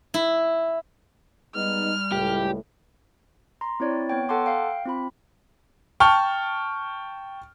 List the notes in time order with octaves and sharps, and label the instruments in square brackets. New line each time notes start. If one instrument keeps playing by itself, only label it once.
[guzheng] E4
[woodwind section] G3 [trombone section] G#3 B3 D#4 [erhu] F6
[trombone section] C#2 A2 [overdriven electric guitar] G4
[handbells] A#5 C6
C4 E4 C#5 D5
B3 C#5 G5
A4 F#5 G5 A5 C6 D6
F5 G5
C4 F4 B5
[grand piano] G5 A5 C#6 F6